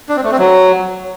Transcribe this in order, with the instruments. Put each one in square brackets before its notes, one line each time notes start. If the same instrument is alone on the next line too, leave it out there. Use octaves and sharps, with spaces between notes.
[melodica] D4
C4
A3
C4
F#3